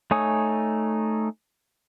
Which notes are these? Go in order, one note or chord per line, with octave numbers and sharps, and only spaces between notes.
A3 D#4 C#5 G#5 D#6